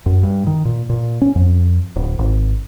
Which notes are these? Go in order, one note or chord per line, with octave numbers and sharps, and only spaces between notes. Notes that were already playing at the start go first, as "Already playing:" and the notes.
F#2
G2
D#3
A#2
A#2
C#4
F2
D1
G#1